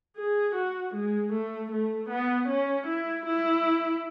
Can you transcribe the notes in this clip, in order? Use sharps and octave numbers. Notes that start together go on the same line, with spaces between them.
G#4
F#4
G#3
A3
A3
B3
C#4
E4
E4